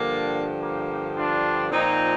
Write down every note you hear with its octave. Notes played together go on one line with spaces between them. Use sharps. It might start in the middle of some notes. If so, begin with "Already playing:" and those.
Already playing: G2 D3 F3 A#3 D4
A#3
D4 F4
A#2 F3 C4 D#4